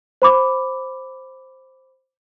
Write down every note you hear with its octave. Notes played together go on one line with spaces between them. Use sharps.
C5 B5 D6